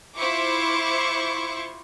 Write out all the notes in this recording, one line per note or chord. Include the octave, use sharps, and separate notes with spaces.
E4 F4 C5 C#6 D6